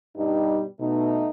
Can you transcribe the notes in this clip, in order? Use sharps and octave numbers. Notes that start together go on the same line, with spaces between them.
G2 B2 G3 D#4
B2 A3 B3 D#4